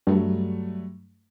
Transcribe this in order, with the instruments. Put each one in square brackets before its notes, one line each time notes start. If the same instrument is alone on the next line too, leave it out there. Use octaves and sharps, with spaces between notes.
[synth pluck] G2 [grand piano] F#3 G3 A3